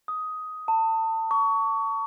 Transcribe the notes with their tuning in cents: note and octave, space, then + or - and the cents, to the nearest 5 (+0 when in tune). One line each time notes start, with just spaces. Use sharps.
D#6 +10
A5 +30
C#6 +25